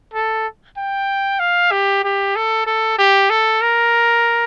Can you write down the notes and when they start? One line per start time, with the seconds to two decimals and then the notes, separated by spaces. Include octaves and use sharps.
0.14 A4
0.77 G5
1.39 F5
1.71 G4
2.04 G4
2.35 A4
2.66 A4
2.98 G4
3.30 A4
3.62 A#4